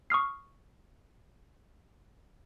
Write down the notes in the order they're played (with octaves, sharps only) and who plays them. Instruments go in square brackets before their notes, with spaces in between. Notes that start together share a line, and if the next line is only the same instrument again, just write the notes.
[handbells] C#6 D#6 F6 C7